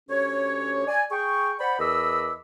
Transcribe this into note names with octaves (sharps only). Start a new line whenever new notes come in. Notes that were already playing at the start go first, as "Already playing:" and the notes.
D2 C#4 G4 C#5
D5 G#5
G#4 G5 C#6
C5 D5 F#5 G5 B5
E2 A#4 D#5 B5 D6 E6